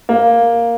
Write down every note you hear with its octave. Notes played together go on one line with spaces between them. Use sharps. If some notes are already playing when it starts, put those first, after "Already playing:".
A#3